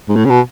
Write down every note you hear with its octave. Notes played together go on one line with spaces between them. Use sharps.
G#2
A2
C#3
B2